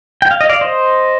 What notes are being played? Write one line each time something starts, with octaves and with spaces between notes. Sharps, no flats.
G5
F5
D#5
D5 F5
C5 D#5